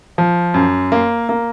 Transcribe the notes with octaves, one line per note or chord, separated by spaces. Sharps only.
F3
F#2
A#3
A#3